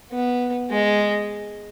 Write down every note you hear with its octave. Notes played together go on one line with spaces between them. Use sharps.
B3
G#3